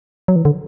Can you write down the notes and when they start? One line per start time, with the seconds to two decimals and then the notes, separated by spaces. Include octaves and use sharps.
0.28 F#3
0.36 E3
0.45 D3